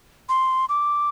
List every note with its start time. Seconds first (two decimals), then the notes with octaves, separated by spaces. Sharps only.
0.29 C6
0.69 D6